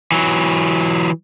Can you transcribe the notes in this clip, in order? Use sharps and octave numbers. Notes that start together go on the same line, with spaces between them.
E3 F#3